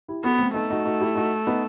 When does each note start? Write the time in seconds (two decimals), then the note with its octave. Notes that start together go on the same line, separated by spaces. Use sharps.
0.08 E4 G4
0.24 B3 F#4 A4
0.39 A3 C4
0.54 A3 B3 D#4
0.70 D#4 F#4
0.85 D#4 F#4
1.00 E4 G4
1.15 D#4 F#4
1.47 B3 D#4